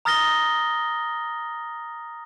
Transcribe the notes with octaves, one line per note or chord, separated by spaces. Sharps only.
A#5 D#6 F6 A6 A#6 G7